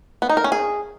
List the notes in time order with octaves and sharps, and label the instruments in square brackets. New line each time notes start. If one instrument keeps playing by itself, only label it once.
[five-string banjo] B3
D#4
A#4
C#4
G#4